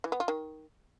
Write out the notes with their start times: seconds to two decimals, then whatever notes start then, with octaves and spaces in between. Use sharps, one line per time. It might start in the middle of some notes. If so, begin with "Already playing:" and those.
0.04 E3
0.12 B3
0.20 F4
0.28 D#3